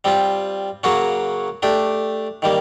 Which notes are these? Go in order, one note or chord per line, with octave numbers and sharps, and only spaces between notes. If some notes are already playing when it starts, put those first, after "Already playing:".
G3 C4 F4
C#3 F#3 A#3 C#4 F#4
A3 D4 G4
D#3 G3 A#3